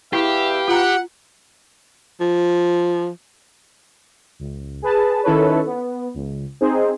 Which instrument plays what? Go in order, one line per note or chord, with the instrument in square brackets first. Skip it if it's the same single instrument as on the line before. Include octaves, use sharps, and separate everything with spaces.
[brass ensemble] E2 E5 [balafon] E4 [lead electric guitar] G4 [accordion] B4 F5 G5
[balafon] F4 A#5 [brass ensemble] F#5
[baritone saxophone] F3
[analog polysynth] C#2
G#4 B4 A5
D#3 C#4 E4 A4 B4 C#5
B3
C#2
C4 D#4 G#4 C5